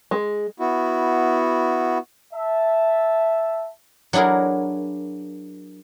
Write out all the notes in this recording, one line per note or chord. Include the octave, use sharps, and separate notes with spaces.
G#3
B3 E4 F#4
E5 A5
F#3 D4 E4 G#4 A#4